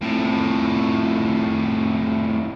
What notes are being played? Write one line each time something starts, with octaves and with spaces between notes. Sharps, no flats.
F2 A2